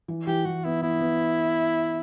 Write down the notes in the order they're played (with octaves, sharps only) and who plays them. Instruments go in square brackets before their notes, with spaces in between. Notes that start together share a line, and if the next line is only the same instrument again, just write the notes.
[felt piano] E3
[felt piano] E3 [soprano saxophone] G4
[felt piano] E3 [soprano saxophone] F#4
[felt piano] B3 [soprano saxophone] E4
[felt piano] B3 [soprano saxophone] E4
[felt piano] B3